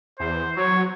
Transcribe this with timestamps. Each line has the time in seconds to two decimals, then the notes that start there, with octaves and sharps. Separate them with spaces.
0.20 E2 C5
0.57 F#3 C#5